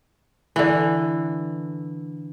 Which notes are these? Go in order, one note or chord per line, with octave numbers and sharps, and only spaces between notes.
D3 E3